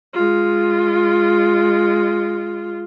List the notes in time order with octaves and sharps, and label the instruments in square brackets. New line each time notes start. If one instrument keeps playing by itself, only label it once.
[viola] G#3 F4